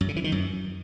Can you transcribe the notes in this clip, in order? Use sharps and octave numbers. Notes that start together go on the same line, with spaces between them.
F#2
C#3
E3
D#3
F#2